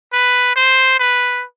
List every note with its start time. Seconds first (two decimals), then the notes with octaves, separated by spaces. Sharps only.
0.13 B4
0.56 C5
0.99 B4